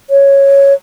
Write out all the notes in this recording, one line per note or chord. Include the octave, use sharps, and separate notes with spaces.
C#5